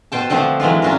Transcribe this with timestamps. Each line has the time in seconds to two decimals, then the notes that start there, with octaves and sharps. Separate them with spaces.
0.12 B2 C5 G5 A5
0.30 D3 F3 A3 C4 D4
0.60 E3 F#3 G#3 F4
0.82 C#4 D4 F4 F#4 A#4